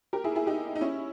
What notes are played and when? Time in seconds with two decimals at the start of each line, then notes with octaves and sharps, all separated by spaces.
0.13 G4 A#4
0.24 E4 G#4
0.36 E4 G#4
0.47 D#4 G4
0.75 D#4
0.81 C#4 E4